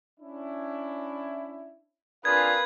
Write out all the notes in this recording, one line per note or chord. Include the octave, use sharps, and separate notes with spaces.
C#4 D4 E4
C4 D4 F4 G#4 A#4 B4 F5 G#6